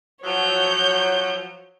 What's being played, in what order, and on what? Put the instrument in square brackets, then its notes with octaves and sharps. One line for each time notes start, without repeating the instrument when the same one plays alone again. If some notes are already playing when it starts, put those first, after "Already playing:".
[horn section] F3 F#3 [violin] C#5 G6